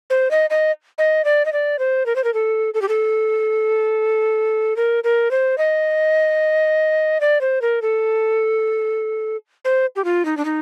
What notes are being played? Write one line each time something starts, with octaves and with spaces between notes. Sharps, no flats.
C5
D#5
D#5
D#5
D5
D#5
D5
C5
A#4
C5
A#4
A4
A4
G4
A4
A#4
A#4
C5
D#5
D5
C5
A#4
A4
C5
G4
F4
D#4
D4
D#4